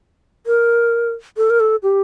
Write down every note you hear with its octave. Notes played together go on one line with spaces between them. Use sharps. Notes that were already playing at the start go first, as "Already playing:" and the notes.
A#4
A4
A#4
A4
G4